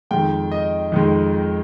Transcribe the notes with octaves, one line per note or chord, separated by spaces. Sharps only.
F2 D#3 G#3 G5
D#5
F2 D#3 G#3